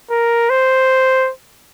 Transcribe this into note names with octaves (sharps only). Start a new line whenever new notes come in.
A#4
C5